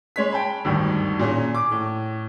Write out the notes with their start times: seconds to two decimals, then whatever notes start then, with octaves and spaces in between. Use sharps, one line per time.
0.16 G#3 C#5 B6
0.32 G5 A5 B5
0.65 G#1 D2 G2 D#3
1.19 A#2 C#4 G#4
1.54 D6
1.71 A2